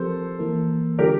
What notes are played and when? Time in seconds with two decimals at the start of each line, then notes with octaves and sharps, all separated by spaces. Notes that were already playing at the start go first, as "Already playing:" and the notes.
Already playing: F3 C4 G4 A4 A#4 C5
0.39 E3 A#3 E4 A#4
0.99 D3 G3 D4 F4 G4 A#4